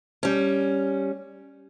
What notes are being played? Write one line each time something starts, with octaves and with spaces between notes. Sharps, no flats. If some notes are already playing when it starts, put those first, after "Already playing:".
G3 C#4